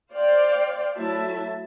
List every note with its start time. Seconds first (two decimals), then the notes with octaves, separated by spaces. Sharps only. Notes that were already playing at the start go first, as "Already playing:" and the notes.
0.13 C5 D5 F5 G5
0.97 F#3 A3 E4 E5 A5